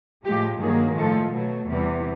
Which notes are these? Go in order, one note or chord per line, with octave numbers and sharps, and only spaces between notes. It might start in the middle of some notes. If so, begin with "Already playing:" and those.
A2 F3 G#3 G4
G2 D#3 F#3 A#3 G#4
A2 F3 G#3 A4
B2 F#3 A3
E2 C3 E3 G3